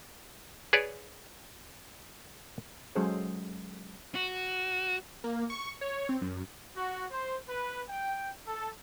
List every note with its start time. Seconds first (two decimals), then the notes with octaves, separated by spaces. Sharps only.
0.73 G#4 B4 C#5 D5
2.95 F#3 G#3 C#4 G#4 A4 C5
4.15 F#4
5.24 A#3
5.50 C#6
5.81 C#5
6.09 C4
6.21 F#2
6.76 F#4
7.10 C5
7.49 B4
7.89 G5
8.47 A4